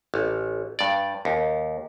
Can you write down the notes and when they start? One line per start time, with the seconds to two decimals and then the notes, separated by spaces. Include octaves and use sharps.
0.14 A1
0.79 G2 D5
1.25 D#2